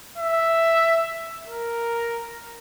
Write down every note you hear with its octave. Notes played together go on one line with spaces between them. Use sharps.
E5
A#4